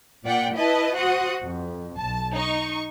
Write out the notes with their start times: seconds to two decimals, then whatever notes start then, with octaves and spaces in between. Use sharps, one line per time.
0.24 A#2 D5 F#5 G5
0.55 E4 B4 D#5 A5
0.95 F#4 C5 F#5 D#6
1.41 F2
1.97 B1 A5
2.34 D#4 C#6